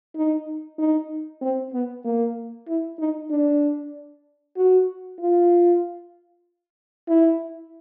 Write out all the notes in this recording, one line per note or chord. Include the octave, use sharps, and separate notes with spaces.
D#4
D#4
C4
B3
A#3
E4
D#4
D4
F#4
F4
E4